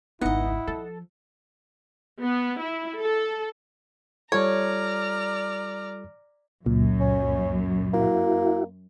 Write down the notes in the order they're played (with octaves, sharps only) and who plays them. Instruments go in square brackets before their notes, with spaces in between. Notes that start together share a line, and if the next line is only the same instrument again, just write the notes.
[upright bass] G#1 C#2 [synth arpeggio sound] B3 D#4 [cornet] E4 [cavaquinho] D#5 F#5
[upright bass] F3 [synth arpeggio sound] A4
[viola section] B3
E4
A4
[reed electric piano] G3 F4 A4 [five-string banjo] C#5 [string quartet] D5 A#5 F6
[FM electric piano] C#2 A#2 [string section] F#2
[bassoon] C#4
[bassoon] A#3 [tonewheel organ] E4 F#4